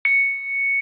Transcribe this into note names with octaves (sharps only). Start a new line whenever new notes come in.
C#7